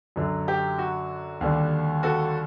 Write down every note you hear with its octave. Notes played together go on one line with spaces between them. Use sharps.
F#2 D3 F#3
G4
F#4
D#2 D3 G3
F#4 A4